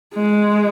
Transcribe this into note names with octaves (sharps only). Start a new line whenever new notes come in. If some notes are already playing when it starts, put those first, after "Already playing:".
G#3